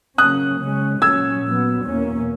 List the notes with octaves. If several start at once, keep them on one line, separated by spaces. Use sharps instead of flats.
C#3 F#3 A#3 C#4 D#6 F#6
C#3 G#3 C#4
A#2 F#3 C#4 E6 G#6
A#2 F#3 B3
E2 B2 A#3 C#4